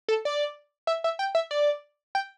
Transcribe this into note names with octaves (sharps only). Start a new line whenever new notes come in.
A4
D5
E5
E5
G5
E5
D5
G5